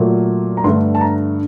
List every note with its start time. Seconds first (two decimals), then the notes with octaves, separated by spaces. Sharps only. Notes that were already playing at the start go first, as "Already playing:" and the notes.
Already playing: A#2 F#3 A3
0.57 A#5
0.64 G2 D3 A3 C6
0.95 A5
1.01 A#5